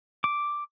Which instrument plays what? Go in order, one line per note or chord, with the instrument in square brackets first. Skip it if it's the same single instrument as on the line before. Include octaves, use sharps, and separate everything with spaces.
[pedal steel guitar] D6